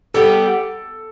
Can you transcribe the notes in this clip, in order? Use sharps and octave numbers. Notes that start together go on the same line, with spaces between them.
G3 B3 G4 A4